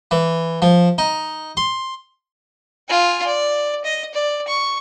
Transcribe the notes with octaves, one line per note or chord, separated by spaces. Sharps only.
E3
F3
D#4
C6
F4 G#5
D5
D#5
D5
C#6